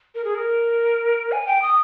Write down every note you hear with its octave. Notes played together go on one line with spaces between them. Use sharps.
A#4
G#4
A#4
G#5
G5
D#6